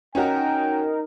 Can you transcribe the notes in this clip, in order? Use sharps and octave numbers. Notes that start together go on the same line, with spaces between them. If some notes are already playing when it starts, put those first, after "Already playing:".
C#4 D#4 F#4 A#4 G5